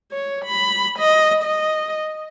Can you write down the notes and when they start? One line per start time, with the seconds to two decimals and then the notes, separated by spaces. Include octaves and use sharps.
0.12 C#5
0.45 B5
0.99 D#5
1.44 D#5